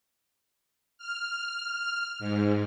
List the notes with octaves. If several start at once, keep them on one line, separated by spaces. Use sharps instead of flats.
F6
G#2